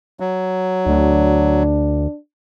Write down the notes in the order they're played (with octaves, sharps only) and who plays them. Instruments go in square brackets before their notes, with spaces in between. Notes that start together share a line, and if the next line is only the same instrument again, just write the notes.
[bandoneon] F#3
[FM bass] D2 [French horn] D4